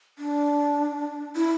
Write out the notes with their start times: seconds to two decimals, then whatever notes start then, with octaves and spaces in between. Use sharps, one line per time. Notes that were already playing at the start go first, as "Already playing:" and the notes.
0.19 D4
1.36 E4